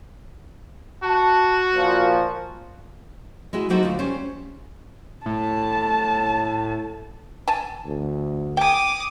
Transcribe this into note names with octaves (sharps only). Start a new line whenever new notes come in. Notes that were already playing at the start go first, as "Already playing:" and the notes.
F#4 A5
A#2 F3
G#3 E4 F#4
F#3 A#3 D#4 F#4 A4 C5
D2 F4
G3 C#4 C5
A2 A5
G#5 A5
D2
G5 G#5 D6 D#6